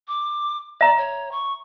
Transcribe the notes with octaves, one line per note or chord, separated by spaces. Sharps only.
D6
D5 E5 A#5
C#5
C#6